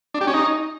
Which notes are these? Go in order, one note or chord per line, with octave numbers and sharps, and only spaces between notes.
D4
G4
C#4
D#4